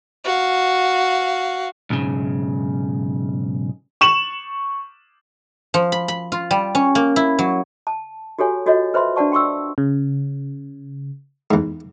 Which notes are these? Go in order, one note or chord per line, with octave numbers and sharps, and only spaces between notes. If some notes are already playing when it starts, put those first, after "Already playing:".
F#4 F5
B1 G#2 C#3
C#6 E7 F#7
F3
B5
B5
F4
G3
C#4
A#3
E4
F#3
A5
F#4 G4 A4 C#5 G#5
F4 F#4 A4 C#5 D#5
B4 C5 E5 B5 C6
D4 B4 D5 F#5 A5 C#6
G5 C6 C#6 E6
C#3
E2 G#2